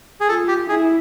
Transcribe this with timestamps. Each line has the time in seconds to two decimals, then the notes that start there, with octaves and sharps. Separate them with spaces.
0.21 G#4
0.28 F4 A4
0.48 G4
0.69 E4 G#4